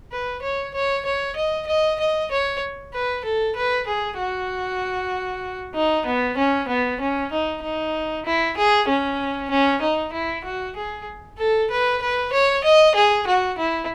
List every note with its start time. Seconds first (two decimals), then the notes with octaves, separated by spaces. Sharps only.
0.12 B4
0.42 C#5
0.74 C#5
1.05 C#5
1.36 D#5
1.67 D#5
2.00 D#5
2.31 C#5
2.94 B4
3.25 A4
3.56 B4
3.87 G#4
4.18 F#4
5.74 D#4
6.06 B3
6.37 C#4
6.68 B3
7.01 C#4
7.32 D#4
7.63 D#4
8.25 E4
8.57 G#4
8.88 C#4
9.50 C#4
9.81 D#4
10.13 E4
10.44 F#4
10.76 G#4
11.38 A4
11.70 B4
12.02 B4
12.33 C#5
12.64 D#5
12.95 G#4
13.27 F#4
13.58 E4